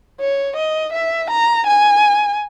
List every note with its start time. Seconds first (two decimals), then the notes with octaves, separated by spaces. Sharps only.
0.20 C#5
0.57 D#5
0.93 E5
1.30 A#5
1.67 G#5